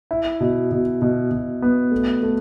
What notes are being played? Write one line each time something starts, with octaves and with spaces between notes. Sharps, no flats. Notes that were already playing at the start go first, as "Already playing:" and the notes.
E4
B2
B2
B2
B2
B3
A3
A3